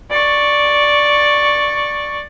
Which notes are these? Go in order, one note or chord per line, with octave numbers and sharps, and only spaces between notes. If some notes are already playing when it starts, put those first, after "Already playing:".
D5 C#6